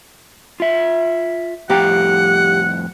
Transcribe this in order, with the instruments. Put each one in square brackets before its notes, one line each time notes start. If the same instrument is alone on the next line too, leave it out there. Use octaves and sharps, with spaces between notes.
[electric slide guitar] F4 E5
[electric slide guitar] F2 A2 A#5 [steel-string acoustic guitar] G4 F5 [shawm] F#5